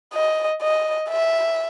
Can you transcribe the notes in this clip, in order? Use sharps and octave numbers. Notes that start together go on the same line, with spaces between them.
D#5
D#5
E5